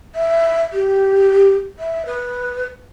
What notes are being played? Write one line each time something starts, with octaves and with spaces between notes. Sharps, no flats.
E5
G4
E5
B4